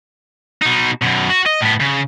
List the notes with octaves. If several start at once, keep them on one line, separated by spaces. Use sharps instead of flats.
B2 D#4
F#2 B2
F#4
D#5
A2 B3
C#3